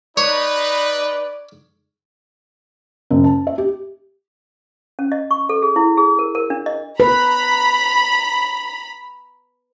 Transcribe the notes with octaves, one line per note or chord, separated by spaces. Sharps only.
D#4 B4 C#5 D5
F#1
A5
E5
G4
C#4
D#5
C#6
A4
G#4
E4
G#4
A#4
A#4
D4
D#5
B4 A#5 B5